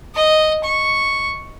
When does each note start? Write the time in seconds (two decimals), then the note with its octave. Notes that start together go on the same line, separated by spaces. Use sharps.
0.15 D#5
0.64 C#6